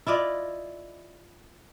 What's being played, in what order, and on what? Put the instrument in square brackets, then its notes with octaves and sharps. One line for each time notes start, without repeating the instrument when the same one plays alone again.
[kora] E4 F4 D5 D#5